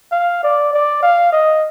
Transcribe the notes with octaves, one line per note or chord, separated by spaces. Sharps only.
F5
D5
D5
F5
D#5